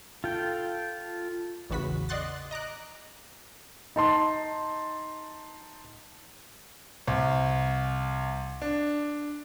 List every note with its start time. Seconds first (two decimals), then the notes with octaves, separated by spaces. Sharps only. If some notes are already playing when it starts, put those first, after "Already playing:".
0.24 F4 A4 G5
1.70 A1 E2 C#3 F#4 B4 B6
2.09 D5 D#5 F#5 C6 F#6 A6
2.51 D#5 A#5 D6 F#6
3.96 D#4 A5 C6
7.07 C2
8.62 D4